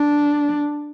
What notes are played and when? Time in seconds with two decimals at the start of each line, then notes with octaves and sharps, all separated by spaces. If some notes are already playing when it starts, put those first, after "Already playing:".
Already playing: D4